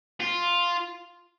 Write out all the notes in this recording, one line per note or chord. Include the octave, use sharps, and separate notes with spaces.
F4